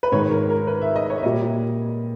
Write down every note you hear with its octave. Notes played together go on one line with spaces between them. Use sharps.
B4
G#2 D#3 G#3 C#5
A#4
A#4
B4
E5
D#5
C#5
E5
A#2 G3 D#5